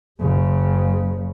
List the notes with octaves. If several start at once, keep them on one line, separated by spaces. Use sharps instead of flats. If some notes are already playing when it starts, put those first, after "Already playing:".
F#1 C#3